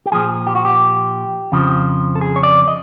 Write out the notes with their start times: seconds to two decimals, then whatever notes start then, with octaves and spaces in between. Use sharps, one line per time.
0.06 G4
0.12 A#2 F3 G#4
0.47 G4
0.55 F#4
0.65 G4
1.52 F2 C#3 F3
2.15 A4
2.21 G#4
2.36 C#5
2.43 D5
2.68 D#5